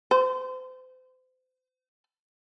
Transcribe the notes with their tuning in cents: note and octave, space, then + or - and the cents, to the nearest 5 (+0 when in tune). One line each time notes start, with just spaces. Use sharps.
C5 -35